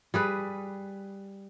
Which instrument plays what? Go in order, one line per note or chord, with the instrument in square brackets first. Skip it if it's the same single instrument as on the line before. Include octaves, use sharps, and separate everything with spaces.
[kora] G3 G#4 B4